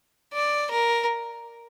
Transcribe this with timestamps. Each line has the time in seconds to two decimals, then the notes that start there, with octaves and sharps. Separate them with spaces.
0.34 D5
0.71 A#4